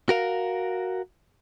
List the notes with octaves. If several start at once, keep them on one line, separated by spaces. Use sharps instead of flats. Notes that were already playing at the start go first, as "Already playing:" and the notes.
F#4 A#4 F5